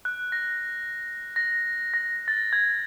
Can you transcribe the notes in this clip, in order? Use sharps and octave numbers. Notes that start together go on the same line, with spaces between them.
F#6
A#6
A#6
A#6
A6
G#6